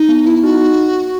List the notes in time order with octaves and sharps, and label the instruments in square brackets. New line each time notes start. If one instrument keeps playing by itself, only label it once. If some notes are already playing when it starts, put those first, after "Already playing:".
Already playing: [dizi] D#4
[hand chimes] B3
[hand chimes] B3 [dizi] E4
[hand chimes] D#4 [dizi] F#4